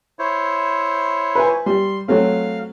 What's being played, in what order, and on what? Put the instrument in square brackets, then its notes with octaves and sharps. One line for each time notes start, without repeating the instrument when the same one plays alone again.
[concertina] E4 C5 C#5
[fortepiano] B4 E5 G#5
[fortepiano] G3 [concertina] C6
[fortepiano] F#3 A3 C4 [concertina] F5